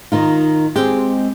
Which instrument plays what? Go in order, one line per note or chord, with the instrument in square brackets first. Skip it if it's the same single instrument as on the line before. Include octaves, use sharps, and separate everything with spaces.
[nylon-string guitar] D#3 D#4 F4
[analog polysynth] G#3 C4 [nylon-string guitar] G4